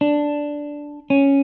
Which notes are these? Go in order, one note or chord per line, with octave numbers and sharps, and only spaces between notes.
D4
C#4